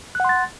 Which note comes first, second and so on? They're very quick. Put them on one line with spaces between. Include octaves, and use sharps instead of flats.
F#6 F#5 C6 A6